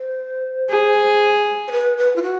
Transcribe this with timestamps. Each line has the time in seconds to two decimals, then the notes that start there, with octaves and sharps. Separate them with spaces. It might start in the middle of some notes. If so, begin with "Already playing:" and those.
Already playing: C5
0.70 G#4
1.67 C5
1.71 B4
1.97 B4
2.15 F4
2.22 F#4